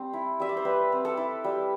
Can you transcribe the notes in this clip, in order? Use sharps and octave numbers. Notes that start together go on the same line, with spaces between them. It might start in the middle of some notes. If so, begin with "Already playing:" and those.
Already playing: G3 C4
E4
G3 E5
D5
C5
G3 B4
C4
A4
E4
G3